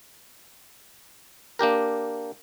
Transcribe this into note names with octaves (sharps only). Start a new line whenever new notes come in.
A#3 D4 G4 A#4